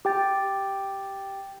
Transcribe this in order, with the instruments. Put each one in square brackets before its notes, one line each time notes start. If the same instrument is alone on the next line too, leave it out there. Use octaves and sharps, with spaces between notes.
[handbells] G4 G5 A6